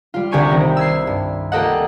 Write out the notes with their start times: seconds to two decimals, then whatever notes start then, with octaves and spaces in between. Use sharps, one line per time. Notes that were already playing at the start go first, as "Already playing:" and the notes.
0.14 G3 F4
0.31 C2 D3 G4 G#5 C#6 D#7
0.50 D#3 C4
0.77 E6 G#6 C7
1.07 G2
1.52 A#3 F4 G4 A4 D#5 F#5